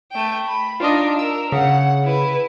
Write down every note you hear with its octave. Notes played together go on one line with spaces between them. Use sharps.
A3 G5
B5
D4 D#4 F4 D#5
A#4 E6
C#3 F#5
E4 B4